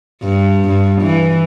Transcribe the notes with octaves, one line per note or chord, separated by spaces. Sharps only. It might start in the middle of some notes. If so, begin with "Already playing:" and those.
G2
G2
E3